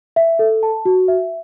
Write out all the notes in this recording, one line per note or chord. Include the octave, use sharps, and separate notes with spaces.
E5
A4
A5
F#4
E5